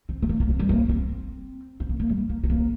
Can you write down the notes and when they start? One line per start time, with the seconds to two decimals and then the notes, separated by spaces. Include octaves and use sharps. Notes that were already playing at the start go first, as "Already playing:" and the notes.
0.09 C4
0.22 C4
0.29 A#3
0.40 A#3
0.49 C4
0.59 G3
0.69 A#3
0.89 C4
1.80 C4
1.89 A#3
1.99 A#3
2.09 G3
2.29 A#3
2.43 C4
2.50 A#3